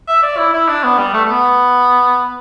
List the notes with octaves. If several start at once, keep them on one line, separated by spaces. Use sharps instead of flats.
E5
D5
E4
E4
D4
B3
G3
A3
A3
B3